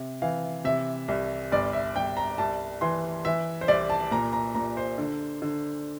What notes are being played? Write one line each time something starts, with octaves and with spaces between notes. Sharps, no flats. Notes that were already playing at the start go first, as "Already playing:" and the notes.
Already playing: C3
E3 F5
C3 E5
C2
G1 D5
E5
G1 G5
A#5
C2 A5
E3 C6
E3 E5
C5
C2 D5
A5
A#2 A#5
A#5
A#2 A#5
C5
D3
D3